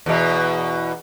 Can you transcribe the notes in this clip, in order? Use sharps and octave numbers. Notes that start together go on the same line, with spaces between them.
E2 B2